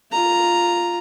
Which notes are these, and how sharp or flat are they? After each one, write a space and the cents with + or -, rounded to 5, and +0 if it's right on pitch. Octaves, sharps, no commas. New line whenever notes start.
F4 +0 A#5 +0